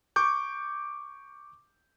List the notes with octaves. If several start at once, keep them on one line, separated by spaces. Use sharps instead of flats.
C#6 D6 G6